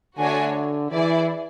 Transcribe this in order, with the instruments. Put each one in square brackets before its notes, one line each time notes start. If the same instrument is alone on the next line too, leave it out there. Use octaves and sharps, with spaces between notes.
[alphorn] D3 [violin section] A3 D4 F#4 C#5 G#5
[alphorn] E3 [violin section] E4 G#4 D5